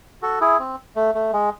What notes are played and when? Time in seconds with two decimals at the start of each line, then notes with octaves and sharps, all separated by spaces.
0.22 F#4 A4
0.41 E4 G#4
0.59 C4
0.96 A3
1.15 A3
1.33 G#3